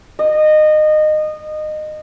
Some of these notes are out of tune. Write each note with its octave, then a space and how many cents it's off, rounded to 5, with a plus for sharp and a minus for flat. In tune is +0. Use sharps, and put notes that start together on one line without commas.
D#5 -20